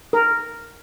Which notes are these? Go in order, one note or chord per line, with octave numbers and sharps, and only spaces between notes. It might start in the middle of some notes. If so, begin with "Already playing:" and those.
A#4